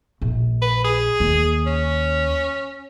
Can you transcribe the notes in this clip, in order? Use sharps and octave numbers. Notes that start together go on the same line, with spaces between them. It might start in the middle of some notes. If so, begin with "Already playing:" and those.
A#1
B4
G#4
D#2
C#4